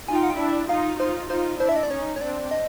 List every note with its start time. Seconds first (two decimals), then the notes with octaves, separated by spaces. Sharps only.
0.08 D#4 F4 G#5
0.16 G5
0.23 F#5
0.30 G5
0.39 D4 E4
0.69 D#4 F4 F5
1.00 D#4 F4 C5
1.30 D#4 F4 C5
1.60 D4 E4 C5
1.69 E5
1.76 D#5
1.83 D5
1.90 C#4 D#4 C#5
2.16 C#5
2.21 C4 D4 D5
2.51 D#5